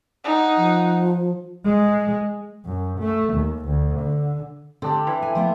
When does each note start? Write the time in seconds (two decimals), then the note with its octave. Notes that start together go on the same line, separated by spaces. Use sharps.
0.25 D#4 F#5
0.57 F3
1.65 G#3
2.65 F#2
2.99 A3
3.34 D#2
3.66 D2
3.99 D3
4.82 D3 C4 D4 G4
5.07 E3
5.22 G#5
5.35 F3 A3 B3